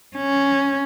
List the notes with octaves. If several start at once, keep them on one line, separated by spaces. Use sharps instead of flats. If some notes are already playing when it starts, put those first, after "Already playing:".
C#4